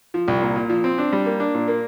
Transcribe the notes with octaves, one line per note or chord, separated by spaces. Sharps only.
F3
C2
A#2
A#2
F3
C4
D4
G3
A#3
D4
A#2
A#3